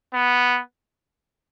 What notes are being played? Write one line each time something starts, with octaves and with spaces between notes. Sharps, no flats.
B3